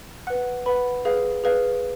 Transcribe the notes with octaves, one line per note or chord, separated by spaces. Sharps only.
B4 F#5 F#6
B4 F#5 B5
G#4 B4 F5
G#4 B4 F5